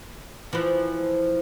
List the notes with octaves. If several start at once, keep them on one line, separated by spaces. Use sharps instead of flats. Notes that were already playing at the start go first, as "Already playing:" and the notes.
E3 F3